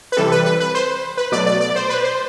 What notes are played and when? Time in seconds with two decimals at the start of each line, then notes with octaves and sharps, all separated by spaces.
0.12 B4
0.17 C3 E3 G3 A4
0.32 B4
0.46 B4
0.60 B4
0.75 C5
1.17 B4
1.32 B2 F#3 A3 D5
1.46 D5
1.61 D5
1.75 C5
1.89 B4
2.04 C5